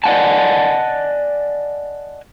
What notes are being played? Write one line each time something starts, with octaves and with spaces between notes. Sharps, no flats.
D5 D#5 F5 F#5 G#5 A5